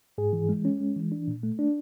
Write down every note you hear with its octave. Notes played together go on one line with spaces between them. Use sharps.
G#2 G#4
E3
G#3
C#4
G#3
E3
D4
A#2
A3
D4